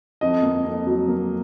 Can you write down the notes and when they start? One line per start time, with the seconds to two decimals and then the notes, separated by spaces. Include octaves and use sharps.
0.21 F2 D#5
0.43 A#3
0.65 F2
0.87 F#3
1.08 A#3